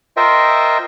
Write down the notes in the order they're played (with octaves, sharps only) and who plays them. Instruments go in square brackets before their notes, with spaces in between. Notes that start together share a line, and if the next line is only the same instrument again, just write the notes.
[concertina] F4 A#4 C5 D#5 E5 G5